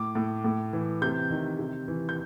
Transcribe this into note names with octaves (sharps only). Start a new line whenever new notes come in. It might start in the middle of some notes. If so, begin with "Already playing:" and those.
Already playing: A2 D6
A2
A2
E3
C3 G6
D#3
C3
E3
G6